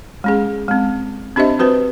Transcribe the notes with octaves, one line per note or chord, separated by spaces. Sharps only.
G#3 C#4 G#4
G#3 C4
C4 D4 G4 C5 D#5 E5
C4 F#4 B4 C5